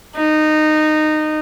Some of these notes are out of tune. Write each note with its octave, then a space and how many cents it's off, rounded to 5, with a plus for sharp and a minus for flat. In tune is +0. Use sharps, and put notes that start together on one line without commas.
D#4 -15